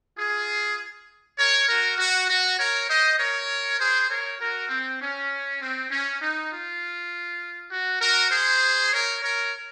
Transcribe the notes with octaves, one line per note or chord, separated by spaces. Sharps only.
F4 G#4
A#4 C#5
F#4 A#4
F#4
F#4
A#4 C#5
C5 D#5
A#4 C#5
G#4 C5
A#4 C#5
F#4 A#4
C4
C#4
C4
C#4
D#4
F4
F#4
F#4 A#4
G#4 C5
A#4 C#5
A#4 C#5